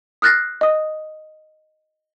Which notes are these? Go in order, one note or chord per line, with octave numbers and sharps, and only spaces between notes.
D#6 F6 F#6 A6 A#6 C7
D#5 D#6